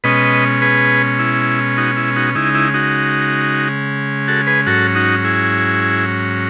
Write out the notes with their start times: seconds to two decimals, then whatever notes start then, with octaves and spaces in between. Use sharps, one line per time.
0.04 B2 G#3 C#4 B4 D#5
0.62 G#4 B4
1.19 E4
1.78 D#4 F#4
1.97 E4
2.16 D#4 F#4
2.35 C#3 G#3 D#4 E4
2.55 E4
2.74 D#4 F#4
4.28 F#4 A4
4.47 G#4 B4
4.66 G#2 F#3 C#4 F#4 A4
4.95 D#4 F#4
5.24 E4 G#4